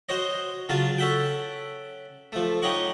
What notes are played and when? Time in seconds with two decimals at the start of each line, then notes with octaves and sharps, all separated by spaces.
0.09 F#4 C5 C#5 D#5
0.69 C#3 F#3 F4 F5 A5
0.98 C#4 A4 E5 F#5 G5
2.32 F3 A3
2.62 D#4 G4 C#5 D#5 F#5 C#6